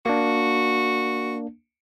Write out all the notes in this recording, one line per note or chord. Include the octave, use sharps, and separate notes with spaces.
A#3 D4 F#4